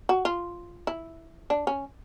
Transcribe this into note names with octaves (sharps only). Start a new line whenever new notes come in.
F#4
F4
E4
D4
C#4